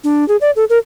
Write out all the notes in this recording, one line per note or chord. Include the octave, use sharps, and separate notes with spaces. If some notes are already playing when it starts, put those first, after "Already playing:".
D4
G#4
D5
A4
A#4